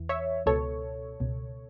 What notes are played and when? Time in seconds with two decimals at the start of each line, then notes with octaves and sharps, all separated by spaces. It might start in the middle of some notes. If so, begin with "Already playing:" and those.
Already playing: E2 E3
0.09 C#5 E5
0.46 C#2 B2 A4 C#5
1.20 C#2 B2